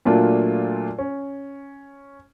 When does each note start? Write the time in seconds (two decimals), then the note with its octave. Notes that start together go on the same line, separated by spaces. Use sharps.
0.05 A#2 F#3 A3 A#3 D4 F4
0.99 C#4